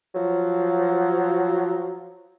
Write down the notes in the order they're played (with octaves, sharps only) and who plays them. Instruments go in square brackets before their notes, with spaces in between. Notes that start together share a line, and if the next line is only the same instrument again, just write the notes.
[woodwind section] F3 F#3